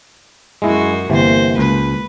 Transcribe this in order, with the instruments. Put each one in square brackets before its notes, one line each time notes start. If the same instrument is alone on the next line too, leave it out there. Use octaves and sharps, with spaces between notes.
[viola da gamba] F#2 F#4 [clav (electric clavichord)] G#3 E4
[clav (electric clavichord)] G1 C3 E3 [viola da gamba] A#3 C5
[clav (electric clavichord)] C#2 [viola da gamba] B4